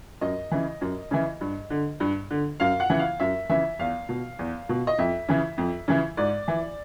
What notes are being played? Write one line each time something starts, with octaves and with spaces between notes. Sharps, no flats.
F#2 D#5
C#3 E3
F#2
C#3 E3
G2
D3
G2
D3
F#2 F5
F#5
C#3 E3
F5
F#2 E5
C#3 E3 E5
E2 F5
B2
E2
B2
D#5
F2 E5
C#3 E3
F2
C#3 E3
G#2 D5
E3